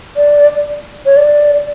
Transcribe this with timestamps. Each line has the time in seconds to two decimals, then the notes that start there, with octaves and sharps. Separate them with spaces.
0.16 D5
1.06 C#5
1.17 D5